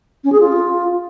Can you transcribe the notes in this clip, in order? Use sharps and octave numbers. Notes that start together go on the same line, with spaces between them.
C#4
G#4
F4